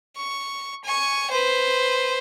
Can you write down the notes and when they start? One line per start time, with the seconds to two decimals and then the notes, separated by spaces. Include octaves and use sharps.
0.16 C#6
0.84 G#5 C#6
1.30 B4 C5